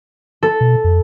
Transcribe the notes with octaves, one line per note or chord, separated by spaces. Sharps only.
A4
B2
F2